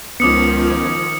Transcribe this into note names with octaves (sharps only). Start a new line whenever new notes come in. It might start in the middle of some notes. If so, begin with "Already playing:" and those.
C#2 D#3 F3 B3 C#4 D6 D#6 C#7